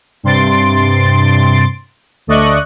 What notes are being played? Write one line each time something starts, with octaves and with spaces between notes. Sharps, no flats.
G2 C3 C6 A6 D7
D2 A3 D5 D#5 C#6 F#6